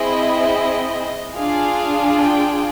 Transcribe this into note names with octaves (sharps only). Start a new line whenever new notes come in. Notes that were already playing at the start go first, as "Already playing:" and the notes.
Already playing: C4 E4 G#4 D#5
D4 F4 G#4 F5
G5